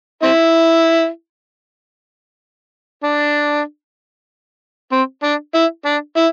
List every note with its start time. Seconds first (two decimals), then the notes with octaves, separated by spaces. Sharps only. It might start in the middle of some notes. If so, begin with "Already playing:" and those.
0.23 C4 E4
3.04 D4
4.92 C4
5.23 D4
5.55 E4
5.86 D4
6.17 E4